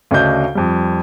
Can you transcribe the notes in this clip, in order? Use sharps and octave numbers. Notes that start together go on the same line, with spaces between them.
D2 C#3 D4 F#4 D#5 G6
F2 G3